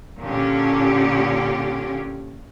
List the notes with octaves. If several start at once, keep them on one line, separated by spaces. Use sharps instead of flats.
A#2 D3 C#4 G4